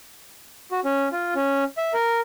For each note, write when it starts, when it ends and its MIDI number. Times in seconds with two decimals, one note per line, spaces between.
0.71 0.80 66
0.85 1.09 61
1.12 1.34 65
1.35 1.64 61
1.77 1.93 76
1.93 2.20 70